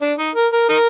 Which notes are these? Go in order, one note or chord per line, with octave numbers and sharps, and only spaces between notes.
D4
D#4
A#4
A#4
D#4 A#4